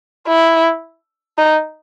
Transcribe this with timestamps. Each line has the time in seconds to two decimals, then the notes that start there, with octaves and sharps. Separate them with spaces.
0.28 E4
1.38 D#4